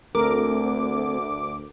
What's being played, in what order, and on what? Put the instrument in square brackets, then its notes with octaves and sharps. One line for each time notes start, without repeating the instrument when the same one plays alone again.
[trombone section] D2 [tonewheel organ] A3 C4 [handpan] A4 A#4 [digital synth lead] D6